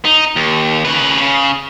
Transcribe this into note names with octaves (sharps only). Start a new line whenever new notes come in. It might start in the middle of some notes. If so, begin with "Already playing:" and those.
D#4
D#2
C#3 B4
C#3